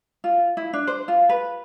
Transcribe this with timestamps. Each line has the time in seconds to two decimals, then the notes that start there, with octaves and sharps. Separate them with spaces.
0.24 F4
0.57 E4
0.73 D4
0.87 C5
1.08 F4
1.29 B4